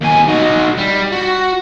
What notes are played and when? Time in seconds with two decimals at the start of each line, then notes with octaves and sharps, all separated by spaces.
0.01 D#2 G#5
0.28 D#4 F#4
0.78 G3
1.12 F#4